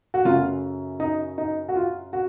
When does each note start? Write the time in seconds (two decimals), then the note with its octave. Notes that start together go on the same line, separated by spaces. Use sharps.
0.14 F#4
0.25 F#2 C#3 A3 F4
1.00 D#4
1.38 D#4
1.69 F#4
1.76 F4
2.13 F#4